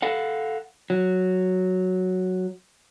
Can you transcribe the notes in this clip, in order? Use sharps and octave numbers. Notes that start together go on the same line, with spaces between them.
A4 F5 F#5
F#3